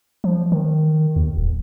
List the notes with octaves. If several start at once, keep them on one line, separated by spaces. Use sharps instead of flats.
F3
D#3
D#2
D1